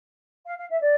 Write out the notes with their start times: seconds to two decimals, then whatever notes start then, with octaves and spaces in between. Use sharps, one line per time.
0.46 F5
0.57 F5
0.69 E5
0.80 D5